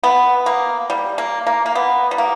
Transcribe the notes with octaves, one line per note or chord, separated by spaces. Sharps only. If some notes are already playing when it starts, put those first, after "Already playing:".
B3
A#3
G3
A#3
A#3
A#3
B3
G3
A#3